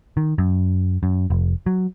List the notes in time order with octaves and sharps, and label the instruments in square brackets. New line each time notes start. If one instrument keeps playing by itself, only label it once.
[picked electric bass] D#3
F#2
F#2
F1
F#3